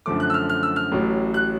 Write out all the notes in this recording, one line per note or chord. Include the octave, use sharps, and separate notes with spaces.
F#2 D3 F3 A3 D6
F#6
E6
F6
F6
E6
F6
A1 A2 F#3
F#6